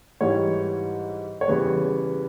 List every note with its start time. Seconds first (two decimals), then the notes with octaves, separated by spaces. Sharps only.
0.21 G#2 E3 G3 C#5
1.41 C#5
1.48 E2 C#3 G3 B4